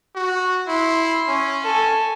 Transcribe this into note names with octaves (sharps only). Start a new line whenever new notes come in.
F#4
E4 C6
C#4
A4 G#5